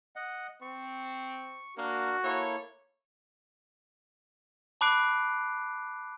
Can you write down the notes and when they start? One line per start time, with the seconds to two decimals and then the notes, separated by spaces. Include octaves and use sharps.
0.16 D#5 F#5
0.62 C4 C#6
1.77 A#3 D4 F#4 A#4
2.24 A#3 E4 A4 C#5
4.81 A5 B5 D6 F#6 C7 D7